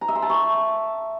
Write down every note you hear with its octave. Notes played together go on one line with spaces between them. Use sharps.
A#5
E5
C6
A5
C#6